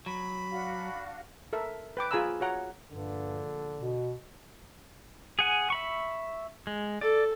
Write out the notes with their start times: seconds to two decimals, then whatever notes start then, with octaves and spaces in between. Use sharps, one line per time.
0.06 F#3 B5
0.51 D4 F#4 F5
1.53 A4 A#4 E5
1.97 B4 G5 D6
2.11 F4 G#4 G#5 A#5 B5 E6
2.40 F#4 C#5 F#5 A#5
2.91 A#1 G2 D3
3.79 B2
5.39 G#4 F#5 G#5
5.70 E5 B5 C#6
6.67 G#3
7.01 A4 D5